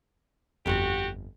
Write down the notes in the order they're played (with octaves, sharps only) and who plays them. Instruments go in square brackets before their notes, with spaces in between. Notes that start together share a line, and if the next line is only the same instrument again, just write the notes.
[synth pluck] G1 F2 [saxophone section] F#4 G4